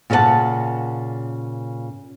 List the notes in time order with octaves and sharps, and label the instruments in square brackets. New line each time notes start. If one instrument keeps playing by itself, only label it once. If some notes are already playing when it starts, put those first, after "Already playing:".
[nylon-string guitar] A#2 C#3 A#3 D5 F#5 A5